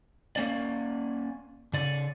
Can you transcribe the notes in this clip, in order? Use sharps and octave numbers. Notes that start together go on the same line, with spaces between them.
A#3 C#4 D5
C#3 D5